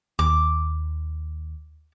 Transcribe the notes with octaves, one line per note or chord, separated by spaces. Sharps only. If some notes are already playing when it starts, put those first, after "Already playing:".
D#2 D6